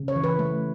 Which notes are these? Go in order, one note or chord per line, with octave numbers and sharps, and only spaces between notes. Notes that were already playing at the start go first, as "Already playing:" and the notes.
Already playing: C#3
C#5
E3
B4
A3